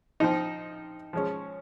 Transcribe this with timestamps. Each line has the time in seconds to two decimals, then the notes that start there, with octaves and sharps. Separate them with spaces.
0.20 F3 C4 D#4
1.13 F3 G#3 C#4